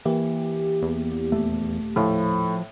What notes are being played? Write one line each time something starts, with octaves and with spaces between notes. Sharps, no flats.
E3 A#3 G4
E2
D#1 A3
A2 F3